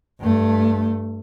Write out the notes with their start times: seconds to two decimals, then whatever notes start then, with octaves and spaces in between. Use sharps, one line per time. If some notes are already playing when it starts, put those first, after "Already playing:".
0.21 G2 A3